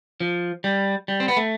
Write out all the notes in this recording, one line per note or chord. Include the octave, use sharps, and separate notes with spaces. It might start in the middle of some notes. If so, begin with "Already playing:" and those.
F3
G3
G3
C4
B3
A3